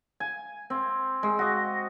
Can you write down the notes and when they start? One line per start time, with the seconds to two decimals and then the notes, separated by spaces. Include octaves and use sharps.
0.20 G#5
0.70 C4
1.23 G#3
1.39 F#4 D#5